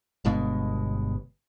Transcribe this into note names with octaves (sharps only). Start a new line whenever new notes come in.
G1 G2 B2 G#3